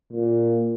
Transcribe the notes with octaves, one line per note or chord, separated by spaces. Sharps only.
A#2